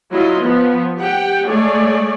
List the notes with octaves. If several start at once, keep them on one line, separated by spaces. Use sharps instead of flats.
F#3 E4 F4 D#5
F3 B3
G4 F#5 G5
G#3 A3 G#4 C#5 D5